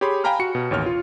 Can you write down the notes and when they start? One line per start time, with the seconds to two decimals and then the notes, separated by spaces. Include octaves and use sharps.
0.01 G4 G#4 C#5 B5 C6
0.24 F5 G5 G#5 A#5 B5 F6
0.39 F#4 C#7
0.55 B2
0.71 A1 D#2 C#5 F6
0.86 F4